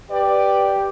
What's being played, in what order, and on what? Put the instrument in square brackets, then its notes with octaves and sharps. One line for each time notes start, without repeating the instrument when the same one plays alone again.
[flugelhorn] G4 [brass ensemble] B4 D5